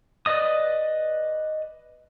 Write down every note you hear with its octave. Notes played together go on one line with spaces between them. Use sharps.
B4 D5 D#5 D#6